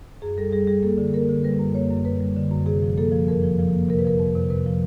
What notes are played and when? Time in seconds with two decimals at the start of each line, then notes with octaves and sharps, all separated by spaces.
0.22 F#2 G#4
0.38 G3 A4
0.52 G3 G#4
0.67 G3 G#4
0.83 A#3 A4
0.98 D3
1.14 A#3 A#4
1.29 D3
1.44 G3 B4
1.60 F#2
1.74 A#3 C#5
1.91 F#2
2.05 F#2 B4
2.20 G3
2.36 D3
2.51 F#2
2.66 C3 G#4
2.82 F3
2.98 A#3 A4
3.12 F3
3.28 F2 A#4
3.43 F3
3.59 F3
3.74 A#3
3.89 C3 A#4
3.99 B4
4.05 F3 A#4
4.20 F2
4.35 C3
4.50 C3 B4
4.66 F3